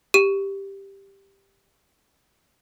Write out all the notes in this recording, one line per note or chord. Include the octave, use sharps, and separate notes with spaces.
G4 D#7